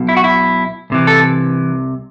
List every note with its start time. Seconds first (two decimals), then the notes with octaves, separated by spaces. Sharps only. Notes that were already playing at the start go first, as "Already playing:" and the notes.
Already playing: B1 B2
0.09 E4
0.17 F#4
0.24 E4
0.90 C2 C3 E3
1.07 A4